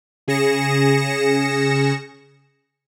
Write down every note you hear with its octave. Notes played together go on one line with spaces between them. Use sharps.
C#3 G#4 A#6 C#7 E7